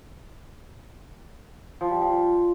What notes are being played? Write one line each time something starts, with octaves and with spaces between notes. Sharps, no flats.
F3
G3
F3